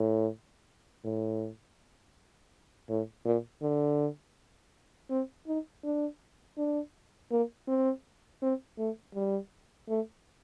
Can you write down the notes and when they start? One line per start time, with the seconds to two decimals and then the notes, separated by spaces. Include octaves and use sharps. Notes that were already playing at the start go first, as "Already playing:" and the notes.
Already playing: A2
1.05 A2
2.89 A2
3.25 A#2
3.62 D3
5.10 C4
5.47 D#4
5.83 D4
6.58 D4
7.31 A#3
7.68 C4
8.42 C4
8.78 A3
9.15 G3
9.89 A3